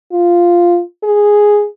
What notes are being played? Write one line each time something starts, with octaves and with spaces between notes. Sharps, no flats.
F4
G#4